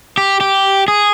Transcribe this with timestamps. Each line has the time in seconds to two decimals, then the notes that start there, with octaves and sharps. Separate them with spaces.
0.17 G4
0.41 G4
0.88 G#4